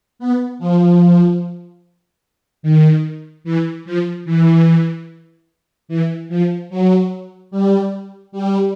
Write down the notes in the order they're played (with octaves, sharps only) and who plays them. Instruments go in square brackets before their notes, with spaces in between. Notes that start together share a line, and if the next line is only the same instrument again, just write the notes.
[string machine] B3
F3
D#3
E3
F3
E3
E3
F3
F#3
G3
G3